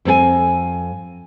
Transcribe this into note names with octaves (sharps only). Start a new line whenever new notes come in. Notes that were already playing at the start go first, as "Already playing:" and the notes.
F2 C4 A4 G#5